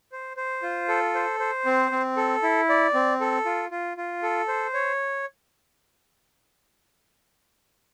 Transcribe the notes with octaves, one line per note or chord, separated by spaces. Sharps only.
C5
C5
F4
A4
C5
C5
C4
C4
A4
E4
D5
C4
A4
F4
F4
F4
A4
C5
C#5